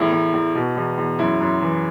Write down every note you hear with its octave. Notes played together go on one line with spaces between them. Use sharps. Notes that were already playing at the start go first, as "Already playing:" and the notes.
Already playing: E2 A2 E4
E2
E2
B2
E2
E2
F#2 E4
F#2
E3